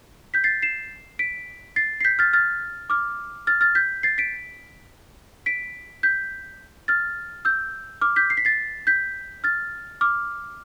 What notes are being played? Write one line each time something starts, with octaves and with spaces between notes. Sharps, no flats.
G6 B6
A6 C7
C7 E7
B6 D7
A6 C7
C7
G6 B6
F6 A6
F6 A6
D6 F6
F6 A6
F6 A6
G6 B6
A6 C7
B6 D7
B6 D7
G6 B6
F6 A6
E6 G6
D6 F6
G6 B6
C7
B6
A6 C7
G6 B6
F6 A6
D6 F6